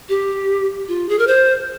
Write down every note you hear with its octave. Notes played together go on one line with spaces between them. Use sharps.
G4
F4
G#4
A#4
C5